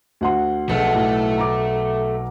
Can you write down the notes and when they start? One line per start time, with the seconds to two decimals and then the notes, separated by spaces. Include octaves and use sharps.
0.21 D2 F#5 C6
0.69 B1 A3
0.95 A2
1.38 A#5 D6